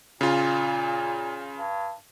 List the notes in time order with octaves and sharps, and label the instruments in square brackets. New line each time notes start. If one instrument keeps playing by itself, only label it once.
[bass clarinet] A#2 [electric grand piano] C#3 F4
[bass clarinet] G2